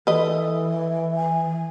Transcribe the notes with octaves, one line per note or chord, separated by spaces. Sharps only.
E3 A4 B4 D#5
G#5